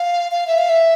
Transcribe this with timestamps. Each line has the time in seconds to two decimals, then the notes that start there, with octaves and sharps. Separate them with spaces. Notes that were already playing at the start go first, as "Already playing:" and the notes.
Already playing: F5
0.32 F5
0.47 E5
0.58 F5
0.69 E5